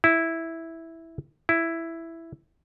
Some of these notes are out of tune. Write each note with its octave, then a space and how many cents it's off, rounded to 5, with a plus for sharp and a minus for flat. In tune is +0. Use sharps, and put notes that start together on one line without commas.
E4 -5
E4 +5